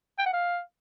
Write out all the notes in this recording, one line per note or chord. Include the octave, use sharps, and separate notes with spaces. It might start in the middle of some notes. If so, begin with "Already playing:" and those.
G5
F#5
F5